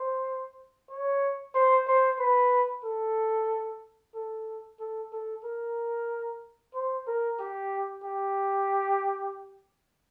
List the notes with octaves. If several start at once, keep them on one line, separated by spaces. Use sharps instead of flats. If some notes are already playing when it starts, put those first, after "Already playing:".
Already playing: C5
C#5
C5
C5
B4
A4
A4
A4
A4
A#4
C5
A#4
G4
G4